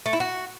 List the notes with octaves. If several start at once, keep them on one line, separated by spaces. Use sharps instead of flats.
A3
E4
F#4